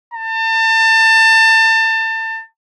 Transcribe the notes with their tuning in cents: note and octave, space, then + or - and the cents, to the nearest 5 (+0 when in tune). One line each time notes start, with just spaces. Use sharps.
A5 +30